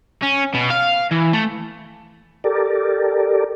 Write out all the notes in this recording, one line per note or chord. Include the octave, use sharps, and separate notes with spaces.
C#4
B2
F5
E3
A3
G4 A4 A#4 D5